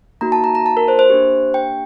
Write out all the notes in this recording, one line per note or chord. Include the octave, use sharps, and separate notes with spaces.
A#3 D#4 F#4 A#5
A5
A#5
A#5
A5
A#4
C5
C5
A#3 D4 G4
G5